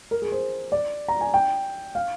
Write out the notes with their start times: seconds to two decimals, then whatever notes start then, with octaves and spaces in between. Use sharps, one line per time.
0.11 A#4
0.22 G#4
0.32 C5
0.72 D5
1.08 A#5
1.21 G#5
1.34 G5
1.95 F5